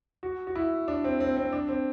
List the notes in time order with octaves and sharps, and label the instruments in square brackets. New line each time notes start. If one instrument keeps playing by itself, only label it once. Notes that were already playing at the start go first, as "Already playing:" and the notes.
[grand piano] F#4
F#4
E4
D4
C4
C4
C4
D4
C4